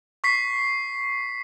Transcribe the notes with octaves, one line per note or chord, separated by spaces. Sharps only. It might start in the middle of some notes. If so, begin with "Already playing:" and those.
C#6 B6 C7